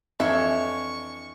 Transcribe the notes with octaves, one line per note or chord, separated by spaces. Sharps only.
F2 E3 D4 C#5 E5 C#6